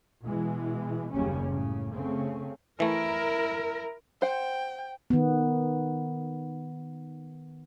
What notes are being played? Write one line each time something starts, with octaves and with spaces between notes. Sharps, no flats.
B2 E3 G#3
F#1 D#2 C#3 G3 C#4
A2 C#3
C#3 A3 C4 C#4
E3 A3 E4 A#4
C5 F#5 G5
D#3 B3